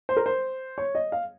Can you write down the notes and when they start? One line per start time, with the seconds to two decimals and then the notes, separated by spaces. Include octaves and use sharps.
0.09 C5
0.17 A#4
0.26 C5
0.78 C#5
0.95 D#5
1.12 F5